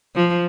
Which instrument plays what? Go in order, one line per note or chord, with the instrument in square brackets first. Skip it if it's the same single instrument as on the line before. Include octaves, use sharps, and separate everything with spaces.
[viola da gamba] F3